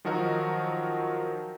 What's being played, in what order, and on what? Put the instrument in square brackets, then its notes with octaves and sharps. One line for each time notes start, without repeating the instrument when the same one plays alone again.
[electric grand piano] D#3 F3 F#3 F#4 A#4 D#5